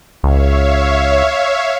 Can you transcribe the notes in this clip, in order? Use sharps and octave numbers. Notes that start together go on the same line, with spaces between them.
C#2 C#5 E5 F5